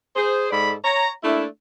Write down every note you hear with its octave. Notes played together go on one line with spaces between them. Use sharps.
G#4 C5
G#2 G#3 A4 D5 B5
C#5 A#5
A3 A#3 D4 E4